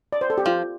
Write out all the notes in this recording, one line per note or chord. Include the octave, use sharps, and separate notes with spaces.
D5
C5
A4
G4
F3 F4